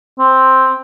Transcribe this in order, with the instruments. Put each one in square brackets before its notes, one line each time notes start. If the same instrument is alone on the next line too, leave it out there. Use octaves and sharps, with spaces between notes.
[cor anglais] C4